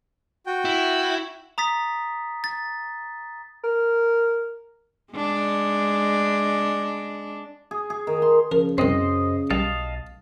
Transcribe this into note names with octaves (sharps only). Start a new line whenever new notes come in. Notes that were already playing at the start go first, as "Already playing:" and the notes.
F#4 G5
E4
A#5 D#6 A6 B6
A6
A#4
G#3 D4
G#4
G#4
D#3
C6
C#3 F3 A#4
C2 F#2 C4 C5 D#5
B1 G3 D#5 F5 A5